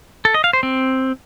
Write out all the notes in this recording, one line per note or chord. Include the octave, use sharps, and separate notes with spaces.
A4
D#5
F5
C5
C4